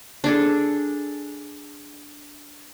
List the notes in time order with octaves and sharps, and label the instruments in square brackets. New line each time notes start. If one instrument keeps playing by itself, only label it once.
[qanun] D4 G#4 A4